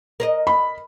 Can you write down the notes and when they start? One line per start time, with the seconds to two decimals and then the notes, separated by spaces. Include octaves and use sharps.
0.20 A#4 C5 D#5
0.47 B5